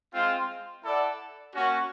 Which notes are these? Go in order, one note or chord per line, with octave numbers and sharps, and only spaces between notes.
G#3 C4 F4
E4 A4 D5 F#5
A#3 C#4 F#4